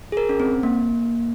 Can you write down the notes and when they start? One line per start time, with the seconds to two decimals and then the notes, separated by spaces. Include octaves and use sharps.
0.12 G#4
0.17 A#4
0.29 C#4
0.40 C4
0.63 A#3